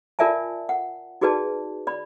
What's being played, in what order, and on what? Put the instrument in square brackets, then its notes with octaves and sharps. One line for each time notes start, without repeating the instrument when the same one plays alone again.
[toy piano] F4 A#4 D5 E5 G#5 A5
F#5
D#4 F#4 G#4 B4 D5 A5
D5 B5